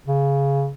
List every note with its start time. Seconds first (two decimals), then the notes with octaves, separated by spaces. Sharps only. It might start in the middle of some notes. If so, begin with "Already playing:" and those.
0.08 C#3